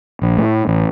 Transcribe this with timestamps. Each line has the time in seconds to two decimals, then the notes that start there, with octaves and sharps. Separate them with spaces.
0.22 A#1
0.37 A2
0.67 A1